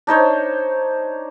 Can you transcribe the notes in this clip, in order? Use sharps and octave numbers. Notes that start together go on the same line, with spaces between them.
D4 D#4 C5 C#5